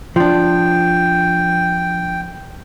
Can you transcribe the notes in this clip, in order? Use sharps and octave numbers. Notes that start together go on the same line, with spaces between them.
F3 D4 G5